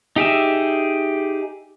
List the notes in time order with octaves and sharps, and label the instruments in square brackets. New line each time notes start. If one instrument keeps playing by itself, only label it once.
[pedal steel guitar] D#4 G4 G#4 E5